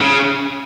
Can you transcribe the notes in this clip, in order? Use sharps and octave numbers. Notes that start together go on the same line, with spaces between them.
C#3